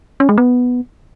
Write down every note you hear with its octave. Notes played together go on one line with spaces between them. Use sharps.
C#4
G#3
B3